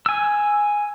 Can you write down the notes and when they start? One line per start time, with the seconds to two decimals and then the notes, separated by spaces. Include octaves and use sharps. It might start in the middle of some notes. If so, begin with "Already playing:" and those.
0.06 G#5 E6